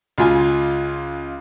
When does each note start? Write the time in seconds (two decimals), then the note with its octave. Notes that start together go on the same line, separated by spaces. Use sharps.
0.18 C#2 F4 G#5